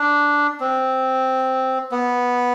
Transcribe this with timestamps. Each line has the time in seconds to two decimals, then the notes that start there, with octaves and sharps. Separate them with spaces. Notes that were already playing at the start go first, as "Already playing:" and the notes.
Already playing: D4
0.60 C4
1.92 B3